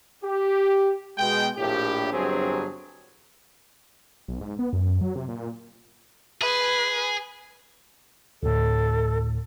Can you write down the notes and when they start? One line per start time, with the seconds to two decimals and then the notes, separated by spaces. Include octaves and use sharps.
0.24 G4
1.18 B2 G#3 G5
1.58 A#1 A2 G4
2.13 G1 G2 F#3 C4 G#4
4.28 B1
4.41 G#2
4.59 B3
4.73 F#2
5.01 F#3
5.16 C3
5.28 A#2
6.42 G#4 B4
8.43 D2 A2 A4